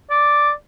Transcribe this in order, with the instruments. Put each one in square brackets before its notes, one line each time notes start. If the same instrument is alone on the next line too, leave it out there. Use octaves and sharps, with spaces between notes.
[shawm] D5